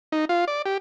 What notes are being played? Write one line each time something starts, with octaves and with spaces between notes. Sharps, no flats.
D#4
F4
D5
G4